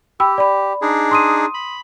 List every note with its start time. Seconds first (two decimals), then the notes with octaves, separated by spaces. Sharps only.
0.20 G4 G5 B5 E6
0.38 D5 B5
0.82 D4 D#4 G#4
1.11 C6 D#6 D#7
1.54 B5